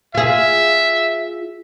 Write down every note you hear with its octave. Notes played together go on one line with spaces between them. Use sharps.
F4 G#4 E5